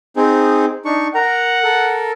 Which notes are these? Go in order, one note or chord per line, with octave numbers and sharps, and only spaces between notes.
C4 D#4 G#4
D4 D#4 C#6
A#4 F#5 A#5
A4 A#4